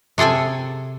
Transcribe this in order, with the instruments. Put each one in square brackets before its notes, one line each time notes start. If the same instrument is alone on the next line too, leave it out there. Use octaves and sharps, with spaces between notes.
[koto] C3 G#4 A4 G5 G#5